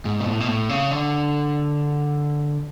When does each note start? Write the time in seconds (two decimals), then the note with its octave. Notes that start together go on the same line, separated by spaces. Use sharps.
0.05 G#2
0.20 B2
0.26 A2
0.40 B2
0.48 A2
0.69 C#3
0.91 D3